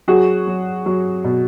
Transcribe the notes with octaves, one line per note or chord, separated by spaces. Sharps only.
F#3 F#4 G#4
F#3
F#3
B2